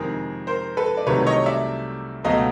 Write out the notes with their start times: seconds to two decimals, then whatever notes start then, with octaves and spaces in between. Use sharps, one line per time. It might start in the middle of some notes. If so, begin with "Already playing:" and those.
Already playing: F2 C3 D#3 G#3 G#4 A#4
0.47 A#4 C5
0.77 A4 B4
0.97 D5
1.06 C2 C3 D#3 F#3 A3 B4 C#5
1.27 C#5 D#5
1.46 D5 E5
2.24 C#2 B2 F#3 A3 D#5 F5